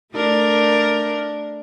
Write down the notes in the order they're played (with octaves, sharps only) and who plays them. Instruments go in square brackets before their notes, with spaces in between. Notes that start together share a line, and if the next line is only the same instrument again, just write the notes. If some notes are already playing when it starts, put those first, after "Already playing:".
[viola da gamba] A3 D4 A#4